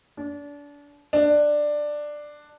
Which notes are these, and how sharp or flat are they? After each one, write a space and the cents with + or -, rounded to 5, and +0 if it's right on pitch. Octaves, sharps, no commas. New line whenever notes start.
D4 -30
D4 +10